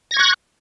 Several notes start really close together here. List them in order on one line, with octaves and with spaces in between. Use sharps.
A#6 G#6 C#6 F#6